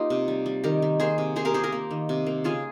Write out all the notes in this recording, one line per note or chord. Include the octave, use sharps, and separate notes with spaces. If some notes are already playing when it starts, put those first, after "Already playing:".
Already playing: A#3 D#4 F4 G4
C3
G3
G3
D#3 G4 A#4
D#3
A#3 G#4 C5
C3
A#3 G#4 C5
G4 A#4
C3 G#4 C5
G4 A#4
A#3
D#3
C3
A#3
C#3 F4 G#4